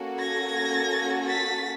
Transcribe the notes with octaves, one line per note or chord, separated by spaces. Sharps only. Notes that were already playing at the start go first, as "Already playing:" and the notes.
Already playing: A#3 C#4 F#4 A4
G#6 A#6
A6 B6